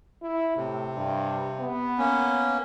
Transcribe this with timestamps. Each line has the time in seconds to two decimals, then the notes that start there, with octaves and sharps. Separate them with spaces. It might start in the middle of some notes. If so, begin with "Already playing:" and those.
0.22 E4
0.56 A2 C3
0.97 G2
1.60 B3
1.98 A#3 C#4